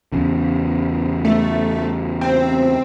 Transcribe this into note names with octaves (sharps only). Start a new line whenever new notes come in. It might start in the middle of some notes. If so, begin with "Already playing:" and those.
E2 C#3
A3
C4